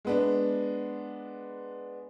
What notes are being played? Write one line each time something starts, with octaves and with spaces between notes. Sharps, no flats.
G#3 B3 D4